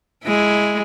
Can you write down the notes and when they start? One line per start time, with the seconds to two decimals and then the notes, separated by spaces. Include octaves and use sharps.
0.24 G#3 E4